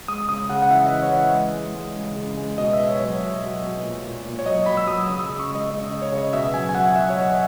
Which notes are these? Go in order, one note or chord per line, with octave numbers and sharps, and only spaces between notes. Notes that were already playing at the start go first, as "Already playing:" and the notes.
G#3 D#6
C#3 D#6
C#3 F#5
F#5
E3 E5
D#5
E3
C#5
E3
D#5
G#3
G#3
G#3
C#3
C#3
G#3
B2 D#5
E5
B2
C#5
F#3 C#5
B2
F#3
B2
A#2
A#2
A#2
C#5
F#3 D#5
F#3 B5
E6
F#3 D#6
C#3 D#6
E6
D#6
C#3
C#6
G#3
D#5
C#3 D#5
D#5
C#3
C#5
C#3
D#5
B2 E5
F#3 G#5
G#5
F#3 F#5
F#3 E5
C#5
F#3 D#5
E5